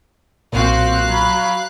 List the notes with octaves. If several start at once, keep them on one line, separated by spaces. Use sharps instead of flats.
B1 A#2 C4 F#4 F5 F#6
F#3 B5